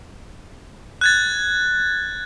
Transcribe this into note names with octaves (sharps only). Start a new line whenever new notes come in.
F#6 G#6 A6